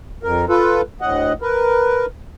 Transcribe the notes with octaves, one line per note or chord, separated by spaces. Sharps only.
F2 A#4
F4 A4 B4
D2 A2 D#5 F#5
A#4 B4